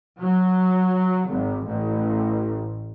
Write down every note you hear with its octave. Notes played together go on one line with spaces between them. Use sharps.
F#3
G#1
A1